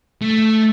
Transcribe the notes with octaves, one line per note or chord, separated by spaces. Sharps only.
A3